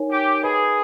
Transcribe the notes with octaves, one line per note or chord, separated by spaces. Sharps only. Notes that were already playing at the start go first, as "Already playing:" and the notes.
Already playing: D#4 A#4 C#5 G#5
G4
G#4 B4 D#5 G#5 B5